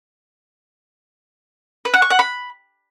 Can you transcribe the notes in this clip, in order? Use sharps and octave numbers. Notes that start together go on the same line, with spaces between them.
B4
F#5
C#6
F#5
B5